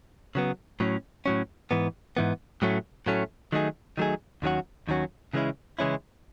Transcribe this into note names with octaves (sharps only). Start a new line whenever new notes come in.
C#3 F#3 B3
A2 F#3 C#4
A2 F#3 C#4
G#2 E3 B3
G#2 E3 B3
A2 F#3 A3 C#4
A2 F#3 A3 C#4
D#3 F#3 A3 D#4 G#4
D#3 F#3 A3 D#4 G#4
D#2 D#3 F#3 C#4 F#4
D#2 D#3 F#3 C#4 F#4
C#3 E3 G#3 C#4 E4
C#3 E3 G#3 C#4 E4